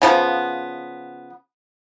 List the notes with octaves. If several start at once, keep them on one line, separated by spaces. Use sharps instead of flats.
C#3 F3 B3